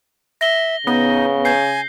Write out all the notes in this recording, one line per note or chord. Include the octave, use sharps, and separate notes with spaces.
E5 A#6 G7
C#3 B3 D#4
G#5 G6 C7